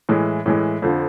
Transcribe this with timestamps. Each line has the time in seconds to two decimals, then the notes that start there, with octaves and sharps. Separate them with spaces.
0.09 A2 E3 G#3
0.46 A2 E3 G#3
0.82 F2 D3 F3